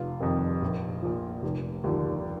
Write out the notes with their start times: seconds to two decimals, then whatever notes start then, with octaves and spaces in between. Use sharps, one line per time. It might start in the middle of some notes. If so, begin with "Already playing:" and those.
Already playing: F1 F4
0.20 F2 C3 D#3
0.62 A#1
1.03 A#2 F3
1.43 F1
1.84 D#2 D3 F3